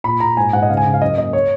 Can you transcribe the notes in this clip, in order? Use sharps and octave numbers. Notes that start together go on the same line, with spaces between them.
A#2 B5
A#2 A#5
G#2 G#5
G#2 F#5
D#5
C#3 F5
G#5
C#3
F5
F#2 D#5
A#3 D#5
C#5